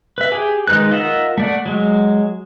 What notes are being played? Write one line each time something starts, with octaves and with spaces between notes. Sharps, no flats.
B4 E5
G4 G#4 G#5
D#3 G#3 D#4 B4 F#6
F4 A#4 D#5 E5 F#5
A3 D5 F#5
F#3 G#3